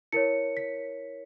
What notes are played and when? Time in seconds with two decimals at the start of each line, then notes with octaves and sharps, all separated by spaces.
0.12 E4 A#4 C#5 C#7
0.57 B6